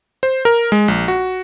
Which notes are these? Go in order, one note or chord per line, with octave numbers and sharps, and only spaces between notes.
C5
A#4
G#3
A#1
F#4